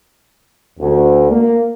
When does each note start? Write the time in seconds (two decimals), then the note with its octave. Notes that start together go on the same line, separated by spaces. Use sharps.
0.80 D2
1.31 A#3